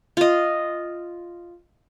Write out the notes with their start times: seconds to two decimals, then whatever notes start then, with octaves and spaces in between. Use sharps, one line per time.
0.17 F4 D#5